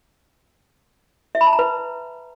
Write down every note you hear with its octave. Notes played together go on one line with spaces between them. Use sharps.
E5
B5
A5
A#5
B4